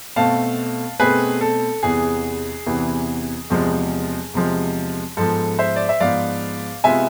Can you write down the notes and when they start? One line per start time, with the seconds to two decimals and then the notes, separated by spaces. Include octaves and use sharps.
0.16 B2 A3 C4 F5 A5
1.00 B2 A3 C4 G#4 B4
1.41 A4
1.83 E2 C3 E3 B3 G#4
2.66 E2 C3 E3 B3
3.50 E2 C3 F3 G#3
4.34 E2 C3 F3 G#3
5.17 G#2 F3 B3 A4
5.59 C5 E5
5.76 D5
5.89 E5
6.00 G#2 F3 B3 D5 F5
6.84 C3 G#3 B3 F4 E5 G#5